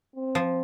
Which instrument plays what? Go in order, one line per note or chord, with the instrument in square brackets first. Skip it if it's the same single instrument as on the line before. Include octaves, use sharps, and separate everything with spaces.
[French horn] C4
[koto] F3